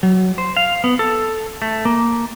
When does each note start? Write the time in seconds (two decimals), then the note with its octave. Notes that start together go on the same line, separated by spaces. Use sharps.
0.03 F#3
0.38 C5
0.57 F5
0.84 B3
0.99 A4
1.62 A3
1.85 A#3